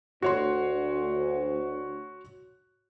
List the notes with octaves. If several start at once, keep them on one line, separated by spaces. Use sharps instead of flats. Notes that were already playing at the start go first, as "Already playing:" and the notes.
D2 F#4 C#5 C6